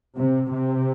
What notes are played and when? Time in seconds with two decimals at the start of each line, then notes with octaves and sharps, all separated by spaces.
0.18 C3
0.52 C3